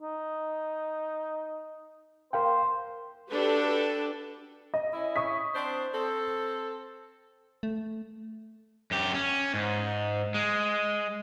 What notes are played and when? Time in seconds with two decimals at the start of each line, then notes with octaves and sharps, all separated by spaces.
0.02 D#4
2.33 A#4 C5 F5 G5
3.30 D4 F#4 G4 A4 B4
4.74 D#5
4.93 C#4 E4
5.16 C#6 D#6 B6
5.55 C4 D4 C5
5.93 C4 A4
7.63 A3
8.91 F#2 G4
9.14 C#4
9.54 G#2
10.34 G#3